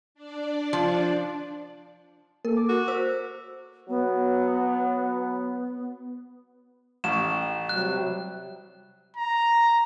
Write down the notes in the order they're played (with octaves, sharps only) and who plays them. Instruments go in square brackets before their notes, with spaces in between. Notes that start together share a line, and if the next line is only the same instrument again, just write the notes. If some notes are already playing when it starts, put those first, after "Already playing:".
[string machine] D4 D5
[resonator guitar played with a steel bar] F3
[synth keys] A#3 A4 [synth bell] A#4
[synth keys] D6
[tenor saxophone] F#4
[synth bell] C5 E6
[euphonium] F#3 [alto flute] B3
[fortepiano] A1 [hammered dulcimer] C#5 F#5 G5 [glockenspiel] E7
[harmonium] C3 F#3 G3 [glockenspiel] F#6
[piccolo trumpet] A#5